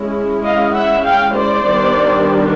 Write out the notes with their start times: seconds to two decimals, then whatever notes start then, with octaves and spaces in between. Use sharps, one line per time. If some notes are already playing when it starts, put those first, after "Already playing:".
Already playing: G#3 C#4 E4
0.43 D#5 F5
0.73 E5 F#5
1.04 F5 G5
1.34 C5 D5
1.65 D#3 G3 B3 D4